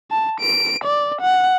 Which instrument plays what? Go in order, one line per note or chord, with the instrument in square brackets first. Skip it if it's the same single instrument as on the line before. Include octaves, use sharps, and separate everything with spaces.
[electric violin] A5
D7
D5
F#5